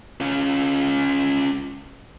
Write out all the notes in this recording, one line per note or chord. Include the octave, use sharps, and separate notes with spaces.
C#4 F4